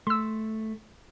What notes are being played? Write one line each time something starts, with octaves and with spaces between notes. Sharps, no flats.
A3 C6 E6